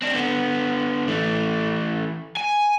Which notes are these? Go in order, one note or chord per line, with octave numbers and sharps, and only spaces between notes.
C4 D4
D3 B3
E3 A3
G#5